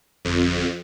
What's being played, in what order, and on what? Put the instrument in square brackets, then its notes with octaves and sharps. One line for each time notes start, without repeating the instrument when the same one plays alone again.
[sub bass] G1 [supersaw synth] F2